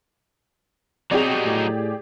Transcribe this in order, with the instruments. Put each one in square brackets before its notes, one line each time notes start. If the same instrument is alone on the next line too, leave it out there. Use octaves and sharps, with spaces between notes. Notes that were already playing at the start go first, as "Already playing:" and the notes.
[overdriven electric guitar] F#3 D#4 [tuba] C4 [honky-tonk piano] G4 G#4 D5
[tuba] A2